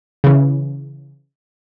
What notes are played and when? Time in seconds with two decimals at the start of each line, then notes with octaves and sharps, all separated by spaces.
0.24 C#3 E3